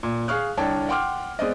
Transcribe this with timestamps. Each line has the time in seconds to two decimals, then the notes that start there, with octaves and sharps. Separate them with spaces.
0.03 A#2
0.28 G#4 F5 C#6 F6 F#6
0.57 C2 D3 D4 C#5 G5 A5
0.89 F#5 G5 C6 D6 F6
1.39 G#3 B3 C4 D5 D#5